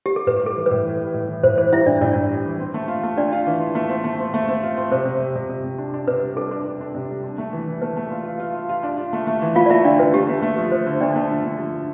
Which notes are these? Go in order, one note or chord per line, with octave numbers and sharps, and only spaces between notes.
G4
A4
A2 B4
G3 A4
E3
A2 B4
E3
G3
A2
E3
A2 C5
E3 C5
G3 E4 E5
A2 D4 D5
A2 D4 D5
A2
G3
E3
C4
A3
F4
A3
D4 F4 D5
F4
E3
F4
A3
C4
A3
C4
A3
C4
F4
C4
C3 C5
C3
C3
C3
C3
C3
D4
D4
C3 B4
G3
D4 A4
D4
D4
D4
C3
G3
D4
A3
E3
E3
A3 B4
A3
F4
F4
F4
F4
F4
D4
F4
A3
A3
E3
A3 F4 F5
D5
A3 E4 E5
D3 D4 D5
D3 B4
A3 G4
A3
A3
F3
D3 C5
D3
A3 D4 D5
A3
D3
A3
F3
D3